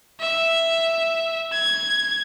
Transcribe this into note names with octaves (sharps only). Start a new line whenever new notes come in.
E5
G#6